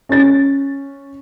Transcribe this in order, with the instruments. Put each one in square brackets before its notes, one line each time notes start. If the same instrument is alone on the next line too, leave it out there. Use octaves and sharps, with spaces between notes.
[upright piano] C#4 A6